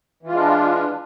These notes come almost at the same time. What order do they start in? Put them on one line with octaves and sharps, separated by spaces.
E3 F4 G#3 D4